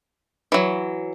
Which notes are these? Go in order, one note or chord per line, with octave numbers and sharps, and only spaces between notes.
E3 F#3